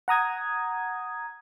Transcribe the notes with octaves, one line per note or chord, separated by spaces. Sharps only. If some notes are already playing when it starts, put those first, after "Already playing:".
F#5 A#5 D#6 G#6